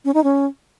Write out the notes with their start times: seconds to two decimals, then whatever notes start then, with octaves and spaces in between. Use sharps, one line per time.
0.05 C#4
0.14 D#4
0.24 C#4